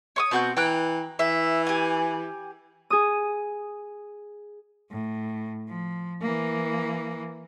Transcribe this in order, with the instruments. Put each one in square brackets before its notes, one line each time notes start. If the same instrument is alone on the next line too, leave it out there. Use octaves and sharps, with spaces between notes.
[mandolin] C#5 C#6 D#6
[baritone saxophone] B2 [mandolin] C4 F#4 G6
[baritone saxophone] E3 [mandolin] G5 A#5 F#6
[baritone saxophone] E3 [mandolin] E5
[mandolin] G4 G#5
[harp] G#4 D#6
[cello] A2
F3
E3 A#3